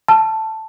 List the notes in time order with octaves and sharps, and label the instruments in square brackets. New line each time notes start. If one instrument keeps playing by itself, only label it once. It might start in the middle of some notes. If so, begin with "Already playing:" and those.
[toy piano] A5